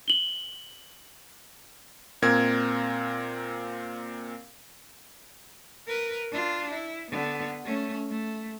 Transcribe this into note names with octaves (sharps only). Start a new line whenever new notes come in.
F#7 G7
A#2 C4 A#4 G#6
A#4 B4
D4 F4
E4
D3 B3
A3 C#4
A3